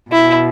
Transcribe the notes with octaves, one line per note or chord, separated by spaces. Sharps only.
B2 E4